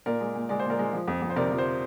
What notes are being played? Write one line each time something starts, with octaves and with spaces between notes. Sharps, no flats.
A#2 A#4 D5
G#3
A#2
G#3 D5
A#2 C5
A#4 D5
G#3
F3
F2
F2
C5
C3 A#4 D5
F3
C5